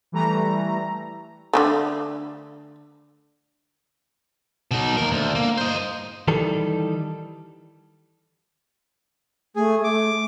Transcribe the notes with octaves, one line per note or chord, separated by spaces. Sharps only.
E3 G3 A3 A#5
D3 D#3 A3
B2 D#4
D#2 A#4
D2
A#3
C5 D#5
D#3 E3 G3 A4
A3 G#4
A3 D6